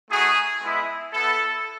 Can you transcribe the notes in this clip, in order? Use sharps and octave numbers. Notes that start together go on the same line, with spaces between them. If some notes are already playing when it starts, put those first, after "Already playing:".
A3 D#4 F#4 G#4
G#3 B3 E4
B3 E4 A4